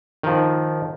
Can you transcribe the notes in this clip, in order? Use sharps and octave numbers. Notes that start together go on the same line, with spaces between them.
D#3 F3